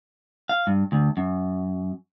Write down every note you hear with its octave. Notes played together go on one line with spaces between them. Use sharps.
F5
G2
D2
F#2